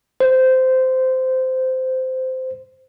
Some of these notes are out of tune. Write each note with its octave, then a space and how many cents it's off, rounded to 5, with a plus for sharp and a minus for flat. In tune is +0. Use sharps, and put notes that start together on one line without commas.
C5 -15